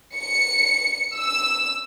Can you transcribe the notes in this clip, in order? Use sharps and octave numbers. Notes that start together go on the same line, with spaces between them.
C#7
E6